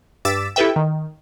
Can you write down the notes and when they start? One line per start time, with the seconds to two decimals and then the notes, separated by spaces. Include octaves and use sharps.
0.25 G2 D6 E6 A6 B6 E7
0.56 E4 G4 A4 B4 E5 G5
0.76 D#3